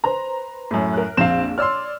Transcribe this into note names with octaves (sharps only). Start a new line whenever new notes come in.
B4 C5 A#5
F#2 A2
A#4 F#6
A#1 F2 C4 F5 E7
C#5 D5 C6 E6 F6